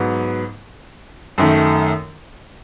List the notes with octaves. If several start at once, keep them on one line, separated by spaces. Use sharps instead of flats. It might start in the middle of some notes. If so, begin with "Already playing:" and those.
Already playing: G#2 F#3 B3
F#2 D#3 A3